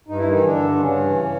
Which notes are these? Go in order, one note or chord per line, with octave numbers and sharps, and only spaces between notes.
G2 D#4
E4
D#3 E3 D#4
D3 D4
G2
G2 C#3 C#4
E3